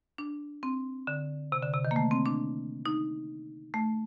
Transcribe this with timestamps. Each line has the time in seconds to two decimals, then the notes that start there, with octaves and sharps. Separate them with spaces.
0.18 D4
0.63 C4
1.07 D3
1.52 C3
1.63 D3
1.73 C3
1.85 D#3
1.91 A#3
1.96 A3
2.11 C4
2.26 D4
2.86 D#4
3.74 A3